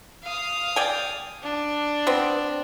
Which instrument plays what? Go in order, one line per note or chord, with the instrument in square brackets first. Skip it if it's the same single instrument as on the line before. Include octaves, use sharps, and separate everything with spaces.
[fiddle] F5 D#6
[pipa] D5 G5 G#5
[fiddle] D4
[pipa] B3 C4